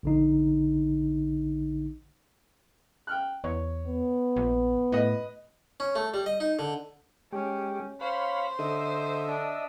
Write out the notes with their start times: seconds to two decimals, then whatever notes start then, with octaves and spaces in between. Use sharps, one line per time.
0.03 A#1 D3 D#4
3.07 G5 F6 F#6
3.44 E2 C#5
3.86 B3
4.36 A#1
4.92 A2 B4 D#5
5.80 C#4
5.95 A3
6.14 G3
6.26 D#5
6.40 D#4
6.59 D3
7.33 G#3 C#4 G4
8.01 C5 C#5 F5 B5
8.59 D3 D#5 E5
9.28 D4